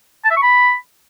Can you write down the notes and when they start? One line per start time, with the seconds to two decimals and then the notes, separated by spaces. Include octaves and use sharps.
0.24 A5
0.31 E5
0.37 C#6
0.43 B5